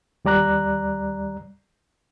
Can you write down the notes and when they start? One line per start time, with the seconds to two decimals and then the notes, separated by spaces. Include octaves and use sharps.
0.25 D#2 G3 D5 A#5 F#6